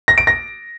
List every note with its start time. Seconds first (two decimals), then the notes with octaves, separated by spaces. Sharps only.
0.08 A#6
0.18 D7
0.27 A#6